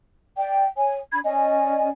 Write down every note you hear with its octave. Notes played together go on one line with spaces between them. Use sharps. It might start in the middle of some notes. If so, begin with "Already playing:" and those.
D5 G5
C#5 G#5
D4 B5 G#6
C#4 D5 D#5 G#5